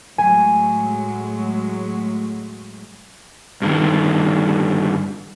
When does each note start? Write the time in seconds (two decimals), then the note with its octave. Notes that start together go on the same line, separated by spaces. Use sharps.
0.18 A2 F#3 G#3 G#5
3.62 G2 D3 D#3